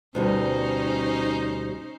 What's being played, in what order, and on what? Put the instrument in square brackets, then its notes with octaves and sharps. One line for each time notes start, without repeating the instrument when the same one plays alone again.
[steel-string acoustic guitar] D2 B2 G3 [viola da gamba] C#4 D#4 C5